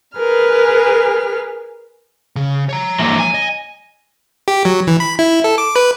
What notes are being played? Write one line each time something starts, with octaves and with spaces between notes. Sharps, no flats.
G#4 A#4 B4 F6
C#3
C#5 A#5
E3 A#3
G#5
D#5
G4
F#3
E3
B5
E4
A4
D6
B4